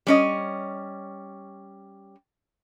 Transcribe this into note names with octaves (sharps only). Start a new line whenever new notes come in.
G3 C#4 D#5